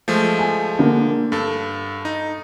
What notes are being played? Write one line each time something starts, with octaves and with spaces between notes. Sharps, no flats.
F3 G#3 A3
G#5
D3 A#3
G2 A4
D#4